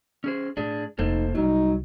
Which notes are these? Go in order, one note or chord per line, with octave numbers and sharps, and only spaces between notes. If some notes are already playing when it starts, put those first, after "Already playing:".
C#4 G#4 C5
A2 D4 G#4
F1 A#3 D#4 A4 C5
C2 F#3 G3 D#4